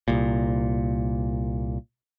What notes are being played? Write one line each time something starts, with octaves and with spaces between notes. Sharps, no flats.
C2 A#2